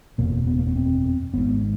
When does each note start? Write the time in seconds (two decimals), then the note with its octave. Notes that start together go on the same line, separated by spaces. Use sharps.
0.18 F#1 E2 B2 A#3
0.47 B3
0.59 A#3
0.67 B3
0.76 C4
1.34 G#1 G#2 B3